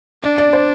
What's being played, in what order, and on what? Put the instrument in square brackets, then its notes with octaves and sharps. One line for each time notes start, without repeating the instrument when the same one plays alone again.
[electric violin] D4 [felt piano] D5
[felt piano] D5
C5